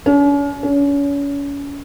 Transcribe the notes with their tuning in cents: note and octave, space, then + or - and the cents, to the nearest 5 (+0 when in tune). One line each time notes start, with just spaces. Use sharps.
C#4 +45
C#4 +35